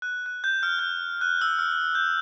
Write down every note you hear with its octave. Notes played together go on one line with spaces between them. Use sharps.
F#6
F#6
G6
F6
G6
F#6
E6
F6
G6